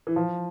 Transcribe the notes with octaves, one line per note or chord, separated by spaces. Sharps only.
E3
F3